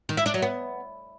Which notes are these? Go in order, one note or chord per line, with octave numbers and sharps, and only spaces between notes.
D#3
E4
D4
F#3
B3